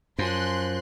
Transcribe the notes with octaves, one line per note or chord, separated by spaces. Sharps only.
F#2 F3 G#5 C6 F#6